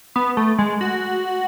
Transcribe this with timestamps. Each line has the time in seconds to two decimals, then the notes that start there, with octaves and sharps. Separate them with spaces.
0.16 B3
0.37 A3
0.58 G#3
0.81 F#4